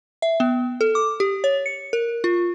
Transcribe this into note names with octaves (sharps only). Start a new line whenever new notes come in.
E5
B3
A4
D6
G4
C#5
C#7
A#4
F4